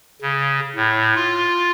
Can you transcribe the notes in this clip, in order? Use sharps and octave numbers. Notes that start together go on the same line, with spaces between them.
C#3
A2
F4